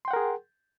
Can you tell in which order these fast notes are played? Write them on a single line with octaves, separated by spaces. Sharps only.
C6 G5 F#5 A#4 G#4